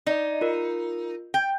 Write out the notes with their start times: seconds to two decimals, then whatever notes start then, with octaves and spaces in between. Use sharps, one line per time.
0.07 D#4 D5 D#5
0.41 F4 A#4
1.34 G5